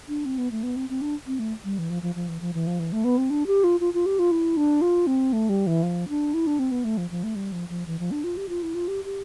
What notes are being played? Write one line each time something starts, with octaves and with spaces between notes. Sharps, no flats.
D4
C4
B3
A3
B3
C4
C4
D4
C4
A3
G3
E3
F3
F3
F3
E3
F3
E3
F3
E3
A3
B3
C4
D4
G4
F4
F4
F4
G4
F4
E4
D4
F4
C4
A3
G3
E3
F3
D4
E4
D4
C4
B3
A3
F3
F3
A3
G3
F3
F3
E3
F3
D4
F4
G4
F4
E4
F4
G4
G4